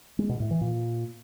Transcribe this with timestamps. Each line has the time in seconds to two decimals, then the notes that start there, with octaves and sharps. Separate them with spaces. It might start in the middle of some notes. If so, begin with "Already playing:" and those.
0.19 G#3
0.29 B2
0.40 A2
0.51 E3
0.61 A#2